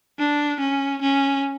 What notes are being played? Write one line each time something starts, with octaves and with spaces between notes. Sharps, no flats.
D4
C#4
C#4